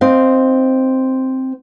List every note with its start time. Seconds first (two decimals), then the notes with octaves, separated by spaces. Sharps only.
0.01 C4 D#4 F5